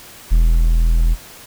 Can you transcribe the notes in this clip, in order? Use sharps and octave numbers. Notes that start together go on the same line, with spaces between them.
E1